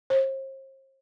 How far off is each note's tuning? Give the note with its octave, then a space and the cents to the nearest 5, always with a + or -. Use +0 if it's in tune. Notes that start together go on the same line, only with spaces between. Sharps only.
C5 +40